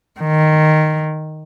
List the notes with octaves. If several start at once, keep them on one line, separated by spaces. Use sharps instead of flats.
D#3